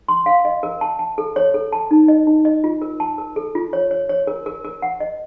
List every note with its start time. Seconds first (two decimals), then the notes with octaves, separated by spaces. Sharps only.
0.08 C6
0.26 F5
0.45 D#5
0.63 A#4
0.81 A5
0.99 A5
1.18 A4
1.36 C#5
1.54 A4
1.72 A5
1.91 D#4
2.08 D#5
2.27 D#4
2.45 D#5
2.64 F4
2.82 A#4
3.00 A5
3.18 A#4
3.36 A4
3.55 F4
3.73 C#5
3.91 C#5
4.09 C#5
4.27 A#4
4.46 A#4
4.65 A#4
4.82 F#5
5.00 D#5